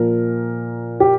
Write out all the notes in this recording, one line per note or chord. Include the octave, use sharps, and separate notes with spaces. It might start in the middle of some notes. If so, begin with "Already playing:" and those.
Already playing: A#2 F3 A#4
G4